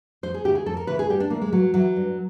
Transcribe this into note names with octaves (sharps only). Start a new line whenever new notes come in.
F2 C5
G#4
C#3 E3 G4
G#4
F2 A4
A#4
C#3 E3 B4
G#4
G2 G4
D4
E3 A#3
G#3
G2 F#3
E3 F#3
G2